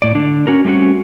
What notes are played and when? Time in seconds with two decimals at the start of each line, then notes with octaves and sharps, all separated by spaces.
0.02 A2 D5
0.15 D3 D4
0.47 C#4 F#4 A#4
0.65 G3 A3 C4 C#4 F#4